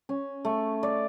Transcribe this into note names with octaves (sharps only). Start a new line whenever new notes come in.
C#4
A3
D5